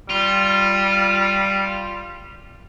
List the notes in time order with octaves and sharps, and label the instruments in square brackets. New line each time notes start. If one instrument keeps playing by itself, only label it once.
[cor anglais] G3 [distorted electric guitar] F4